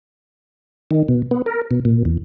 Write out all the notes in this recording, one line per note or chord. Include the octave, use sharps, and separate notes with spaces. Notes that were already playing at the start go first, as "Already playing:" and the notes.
D#3
B2
B3
A#4
B2
A#2
E2